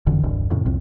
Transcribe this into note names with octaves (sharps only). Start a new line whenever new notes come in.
F#1 F2 D3 E3
E1 C2 G2
F2 A2 C#3
C2 F2 C3